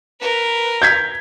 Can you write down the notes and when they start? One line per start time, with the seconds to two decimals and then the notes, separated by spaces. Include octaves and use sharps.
0.21 A#4 B4
0.82 G6 G#6 B6